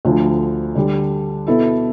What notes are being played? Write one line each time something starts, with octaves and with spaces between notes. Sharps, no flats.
D2 D3 F3
D3 G3 D4 G4
B2 B3 E4 A4